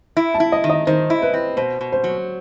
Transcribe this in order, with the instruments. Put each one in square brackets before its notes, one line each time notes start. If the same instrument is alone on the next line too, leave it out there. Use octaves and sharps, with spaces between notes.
[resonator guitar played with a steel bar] E4
[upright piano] A5
[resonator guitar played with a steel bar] E4
[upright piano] D#5
[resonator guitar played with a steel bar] D#3
[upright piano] D#5
[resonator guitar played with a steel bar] D#3 [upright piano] C5
[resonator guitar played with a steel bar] E4
[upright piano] B4
[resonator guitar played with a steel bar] C4
[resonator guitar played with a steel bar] B2 [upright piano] C5
[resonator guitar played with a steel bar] B2
[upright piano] C5
[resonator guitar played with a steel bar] F#3